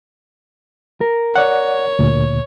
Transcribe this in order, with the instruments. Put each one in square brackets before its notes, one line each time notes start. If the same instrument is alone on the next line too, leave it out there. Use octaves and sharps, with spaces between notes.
[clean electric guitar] A#4
[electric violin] C#5 [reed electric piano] D5 F#5
[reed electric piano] D2 A#2